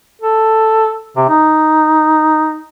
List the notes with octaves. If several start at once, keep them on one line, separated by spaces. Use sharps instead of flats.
A4
C3
D#4